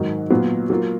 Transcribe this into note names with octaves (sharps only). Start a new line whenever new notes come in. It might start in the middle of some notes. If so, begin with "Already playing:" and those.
Already playing: G#2 D#3 F#3
A#2 F#3 B3 F4
F#3 A#3 F4